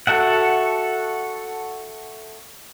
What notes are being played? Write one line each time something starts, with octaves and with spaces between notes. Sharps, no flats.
F#4 A4 E5 F#5